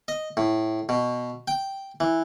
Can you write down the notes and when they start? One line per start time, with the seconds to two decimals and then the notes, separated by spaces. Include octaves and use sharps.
0.08 D#5
0.37 A2
0.89 B2
1.48 G5
2.00 E3